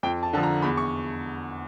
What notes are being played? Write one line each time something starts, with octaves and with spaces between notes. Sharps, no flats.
F2 G5
A5
D3 F3 A5
A#5
E2 B5
C#6